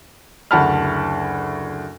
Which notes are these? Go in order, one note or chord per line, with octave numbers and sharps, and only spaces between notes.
F#1 D2 F#5 A5 B5 F6